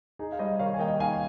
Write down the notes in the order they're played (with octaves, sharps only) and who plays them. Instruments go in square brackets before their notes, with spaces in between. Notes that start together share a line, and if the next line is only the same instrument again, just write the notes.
[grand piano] D#4 G#4
F5
G3 C5 D#5
D#3 C#5 F5
G#5
A#3 D#5 G5
D#4 F5 G#5